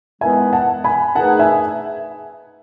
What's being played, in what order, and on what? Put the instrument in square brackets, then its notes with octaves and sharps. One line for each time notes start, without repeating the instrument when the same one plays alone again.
[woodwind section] D#3 G#3 B3 E4 B4 [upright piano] E5 G#5
[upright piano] F#5 A5
G#5 B5
[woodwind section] D#3 A3 D#4 G#4 B4 [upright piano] F#5 A5
[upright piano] E5 G#5